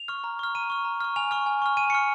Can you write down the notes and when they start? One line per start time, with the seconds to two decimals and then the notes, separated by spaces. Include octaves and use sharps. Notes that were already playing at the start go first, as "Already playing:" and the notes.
Already playing: F7
0.08 C#6 F6
0.24 A#5
0.39 C#6 F6
0.55 A#5 D#7
0.70 C#6 F6
0.85 A#5
1.00 C#6 F6
1.16 G#5 F7
1.31 C#6 F6
1.46 G#5
1.62 C#6 F6
1.77 G#5 D#7
1.90 C#6 F6 C#7